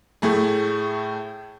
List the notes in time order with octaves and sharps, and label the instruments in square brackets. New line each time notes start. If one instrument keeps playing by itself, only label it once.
[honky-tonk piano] A2 A3 G#4